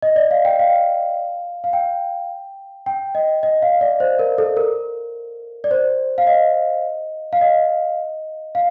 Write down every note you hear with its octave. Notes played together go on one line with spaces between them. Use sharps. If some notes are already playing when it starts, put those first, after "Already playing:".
D#5
D5
F5
G5
F5
F5
G5
G5
D#5
D#5
F5
D5
C5
A#4
A4
A#4
D5
C5
F5
D#5
F5
D#5
F5